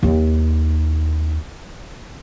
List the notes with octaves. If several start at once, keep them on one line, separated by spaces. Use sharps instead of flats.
D#2 D#4